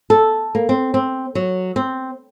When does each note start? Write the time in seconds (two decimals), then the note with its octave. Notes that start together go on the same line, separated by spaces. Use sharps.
0.10 A4
0.55 A#3
0.69 C4
0.94 C4
1.35 F#3
1.76 C4